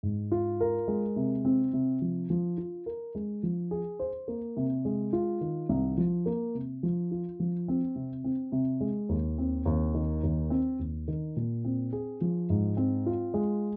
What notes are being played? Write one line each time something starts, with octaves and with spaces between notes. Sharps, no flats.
G#2
F4
A#4
G#3
C3
C4
C3
F3
F3
F4
A#4
G#3
F3
G#4
C5
A#3
C3
G#3
F4
D#3
C2
F3
A#3
C3
F3
F4
F3
C4
C3
C4
C3
G#3
D#2
C4
D#2
D#3
D#2
C4
D#2
D#3
A#2
C4
G#4
F3
G#2
C4
F4
G#3